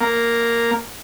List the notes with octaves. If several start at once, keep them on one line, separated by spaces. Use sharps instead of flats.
A#3